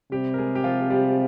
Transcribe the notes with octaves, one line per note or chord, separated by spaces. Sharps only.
C3 G3 G4
A#4
G#3 G#4
G4
F3 F4
G3 G4